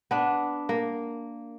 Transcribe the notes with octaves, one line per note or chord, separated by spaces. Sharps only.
B3 D4
A#3